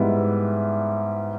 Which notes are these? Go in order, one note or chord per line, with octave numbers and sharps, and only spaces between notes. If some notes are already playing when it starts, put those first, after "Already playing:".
Already playing: G#2 G3 B3 E4